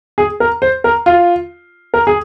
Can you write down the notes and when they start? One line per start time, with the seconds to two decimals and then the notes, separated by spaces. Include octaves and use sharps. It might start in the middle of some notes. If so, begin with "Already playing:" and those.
0.18 G#4
0.40 A#4
0.62 C5
0.84 A#4
1.06 F4
1.94 A#4
2.07 G#4